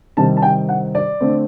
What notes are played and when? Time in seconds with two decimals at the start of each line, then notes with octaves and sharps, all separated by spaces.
0.17 C3 D#3 G3 C4 A5
0.37 A5
0.42 G5
0.69 F#5
0.95 D5
1.20 D3 A3 C4